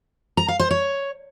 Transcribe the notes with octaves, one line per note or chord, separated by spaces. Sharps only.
A#5
F5
C5
C#5